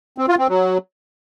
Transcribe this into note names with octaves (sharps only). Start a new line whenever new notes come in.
C4
F4
C4
F#3